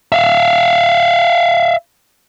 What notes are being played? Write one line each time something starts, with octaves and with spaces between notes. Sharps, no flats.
E5 F5